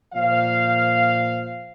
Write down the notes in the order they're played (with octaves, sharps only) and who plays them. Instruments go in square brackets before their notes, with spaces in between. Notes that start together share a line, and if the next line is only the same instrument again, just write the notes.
[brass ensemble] A#2 F3 C5 F5